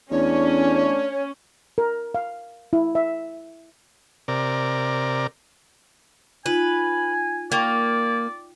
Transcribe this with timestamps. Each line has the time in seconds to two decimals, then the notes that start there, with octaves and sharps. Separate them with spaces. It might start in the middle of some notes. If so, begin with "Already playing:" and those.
0.11 E2 A3 C#4 D4 C#5
1.78 A#4
2.15 F5
2.73 E4
2.95 E5
4.28 C3 A#4 D5
6.46 D#4 F4 B4 G#5
7.52 A#3 D5 G5 C#6